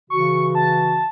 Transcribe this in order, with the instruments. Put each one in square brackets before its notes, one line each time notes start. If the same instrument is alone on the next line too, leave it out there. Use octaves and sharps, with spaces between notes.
[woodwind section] C#3 E3 F#4 [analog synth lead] C#6
[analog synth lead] A5